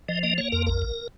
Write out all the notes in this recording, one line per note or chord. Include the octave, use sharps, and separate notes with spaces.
F3 D#5
A#3 D#5
A#3 C#5
F2 A#4
A#1 A#4
A#1